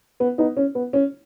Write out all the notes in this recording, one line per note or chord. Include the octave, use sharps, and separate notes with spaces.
B3
B3 D#4
C#4
B3
C#4